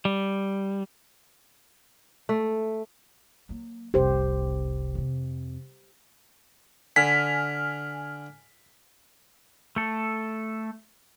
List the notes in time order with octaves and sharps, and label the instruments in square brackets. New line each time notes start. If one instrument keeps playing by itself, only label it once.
[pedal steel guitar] G3
[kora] A3
[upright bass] F#3 A#3
[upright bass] F1 C2 [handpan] G4 C5
[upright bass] F2 C3
[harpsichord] D3 [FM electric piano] G#5 F6 [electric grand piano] B6
[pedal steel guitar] A3 A4